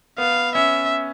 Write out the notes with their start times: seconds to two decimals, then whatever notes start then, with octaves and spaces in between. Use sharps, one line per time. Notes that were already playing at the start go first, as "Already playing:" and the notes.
0.18 B3 F5
0.55 C#4 E5